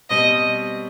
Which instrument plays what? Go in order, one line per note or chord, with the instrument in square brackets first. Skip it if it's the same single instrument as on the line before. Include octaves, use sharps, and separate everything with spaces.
[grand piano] B2 G3 C4 [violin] D#5